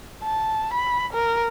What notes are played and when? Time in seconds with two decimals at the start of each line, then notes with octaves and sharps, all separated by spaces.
0.23 A5
0.73 B5
1.13 A#4